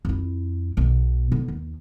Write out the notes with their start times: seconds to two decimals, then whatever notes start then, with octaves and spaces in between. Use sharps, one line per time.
0.05 F2 E4
0.77 B1 B2
1.32 D3 B3
1.48 D#2